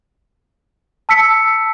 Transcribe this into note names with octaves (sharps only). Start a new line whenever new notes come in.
A5 E6 B6 C#7